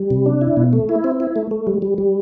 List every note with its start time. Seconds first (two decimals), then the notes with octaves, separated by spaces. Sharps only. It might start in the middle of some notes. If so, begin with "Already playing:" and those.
Already playing: G3
0.10 C3
0.26 D4
0.41 E4
0.57 B2
0.73 A3
0.89 E4
1.04 C4
1.20 E4
1.36 A3
1.51 A3
1.67 G3
1.82 G3
1.98 G3